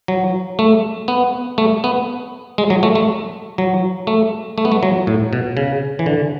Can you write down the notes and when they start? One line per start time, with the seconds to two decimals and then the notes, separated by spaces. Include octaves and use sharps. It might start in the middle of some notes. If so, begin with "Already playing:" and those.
0.08 F#3
0.59 A3
1.08 B3
1.58 A3
1.84 B3
2.58 G#3
2.70 F#3
2.83 A3
2.95 A3
3.58 F#3
4.07 A3
4.58 A3
4.65 B3
4.72 A3
4.83 F#3
5.07 A2
5.33 B2
5.57 C#3
5.99 E3
6.06 D3